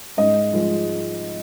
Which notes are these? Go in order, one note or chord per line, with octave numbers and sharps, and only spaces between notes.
G#2 D#5
F3 G#3